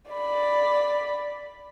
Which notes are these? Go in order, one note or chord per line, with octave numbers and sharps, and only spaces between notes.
D5 B5